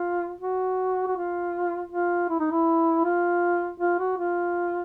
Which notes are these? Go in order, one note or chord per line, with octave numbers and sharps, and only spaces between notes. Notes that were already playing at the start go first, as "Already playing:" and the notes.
Already playing: F4
F#4
F#4
F4
F4
E4
D#4
E4
F4
F4
F#4
F4